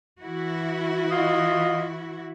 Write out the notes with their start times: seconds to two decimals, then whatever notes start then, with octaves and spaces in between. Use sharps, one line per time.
0.22 E3 E4 F#4
1.11 F4 D#5